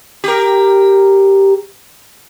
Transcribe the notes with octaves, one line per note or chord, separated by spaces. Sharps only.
G4 A#4